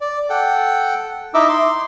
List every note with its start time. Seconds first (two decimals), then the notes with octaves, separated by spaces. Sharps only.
0.01 D5
0.30 A4 F#5 G5
1.34 D#4 E4 D#5 E5 D6 E6
1.49 C6